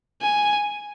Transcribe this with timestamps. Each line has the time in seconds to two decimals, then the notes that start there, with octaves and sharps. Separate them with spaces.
0.22 G#5